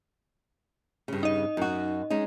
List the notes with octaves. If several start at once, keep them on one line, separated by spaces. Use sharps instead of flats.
G2 C#3
D#4 D#5
F#2 F#4
G#3 C#4 D#4